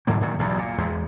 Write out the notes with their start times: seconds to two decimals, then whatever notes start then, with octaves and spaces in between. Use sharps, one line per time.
0.07 G#2 D3 F#3 A#3
0.21 A#2 D#3 F#3
0.39 B1 E2 G2 F#3
0.58 A#2
0.78 E2 G#3